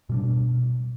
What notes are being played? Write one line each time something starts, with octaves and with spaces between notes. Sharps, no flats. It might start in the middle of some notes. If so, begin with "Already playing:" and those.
B2 G3 D4